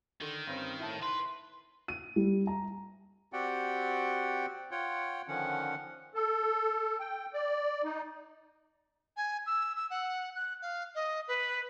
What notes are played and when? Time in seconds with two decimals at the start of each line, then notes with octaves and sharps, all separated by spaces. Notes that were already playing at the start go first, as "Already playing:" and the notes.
0.21 D3 D#3
0.47 G2 C4 C#4
0.80 A2 E4 A5
1.02 B4 C6
1.88 D#7
2.16 G3
2.47 A#5
3.33 C4 F#4 G4 D5 F#5 G5
4.71 F4 C#5 F#5 G5
5.28 D3 D#3 F3 C#4 F#5
6.15 A4
7.00 G5
7.33 D5
7.84 D#4
9.17 G#5
9.46 E6
9.76 E6
9.90 F#5
10.35 F#6
10.62 F5
10.95 D#5
11.28 B4